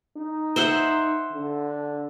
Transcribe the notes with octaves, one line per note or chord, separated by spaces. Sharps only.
D#4
C5 E5 F#5
D3